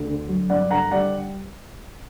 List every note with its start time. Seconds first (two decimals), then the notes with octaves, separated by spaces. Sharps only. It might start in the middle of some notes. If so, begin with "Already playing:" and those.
Already playing: D2
0.08 D3
0.28 F#3
0.49 G2 D5 F#5
0.71 D3 F#5 A#5
0.92 G3 D5 F#5